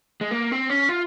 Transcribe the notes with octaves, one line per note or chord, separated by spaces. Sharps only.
G#3
A#3
C4
C#4
F4